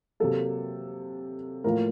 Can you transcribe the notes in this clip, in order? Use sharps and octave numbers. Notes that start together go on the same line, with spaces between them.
C3 F#3 A#3 A4
A2 F3 A#3 A#4